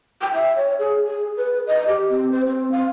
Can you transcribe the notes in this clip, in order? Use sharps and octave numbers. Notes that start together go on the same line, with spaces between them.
G5
E5
C#5
G#4
G#4
B4
D#5
G4
C4
C5
C4
F5